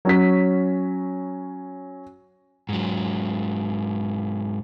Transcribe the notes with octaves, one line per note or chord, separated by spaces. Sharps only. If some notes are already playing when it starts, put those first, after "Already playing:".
F#3 C#4 B6
G#2 F#3